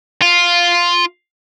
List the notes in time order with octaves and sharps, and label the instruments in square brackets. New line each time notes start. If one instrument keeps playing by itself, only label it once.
[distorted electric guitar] F4